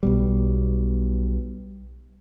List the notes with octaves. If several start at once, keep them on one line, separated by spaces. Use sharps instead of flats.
B1 B2 G3